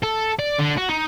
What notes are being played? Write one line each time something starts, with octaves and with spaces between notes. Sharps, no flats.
A4
D5
D3
F#4
D#4